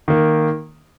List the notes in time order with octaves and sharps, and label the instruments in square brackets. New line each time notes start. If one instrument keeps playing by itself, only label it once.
[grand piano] D#3 A#3